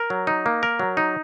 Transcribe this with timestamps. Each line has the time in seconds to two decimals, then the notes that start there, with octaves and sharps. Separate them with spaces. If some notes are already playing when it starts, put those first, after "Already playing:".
Already playing: A#4
0.10 F#3
0.27 D#4
0.46 A#3
0.63 A#4
0.79 F#3
0.97 D#4